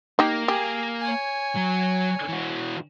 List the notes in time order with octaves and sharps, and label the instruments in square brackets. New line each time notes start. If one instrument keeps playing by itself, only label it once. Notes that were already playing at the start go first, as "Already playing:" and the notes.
[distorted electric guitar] A#3 [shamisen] D#4 G4
[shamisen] G4 [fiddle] G#4
[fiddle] C#5 G#5
[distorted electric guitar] F#3
E3 F#4